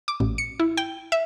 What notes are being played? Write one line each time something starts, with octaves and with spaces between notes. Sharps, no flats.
D6
A1
C#7
E4
G5
E5